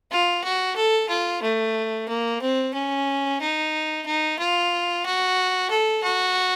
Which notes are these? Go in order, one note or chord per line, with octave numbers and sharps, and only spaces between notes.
F4
F#4
A4
F4
A3
A#3
C4
C#4
D#4
D#4
F4
F#4
A4
F#4